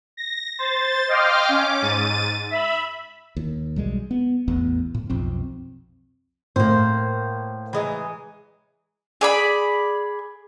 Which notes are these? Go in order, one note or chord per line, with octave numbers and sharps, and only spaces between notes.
A#6
C5 A6
D#5 F5 G5 C6 D6 F6
C#4 D6
G#2 A6 D#7
E5 B5
D#2
B1 G3 G#3
B3
A1 E2 B3
A2
B1 F2 C4
A2 A#3 C5
E3 G#3 D#4
G#4 D5 B5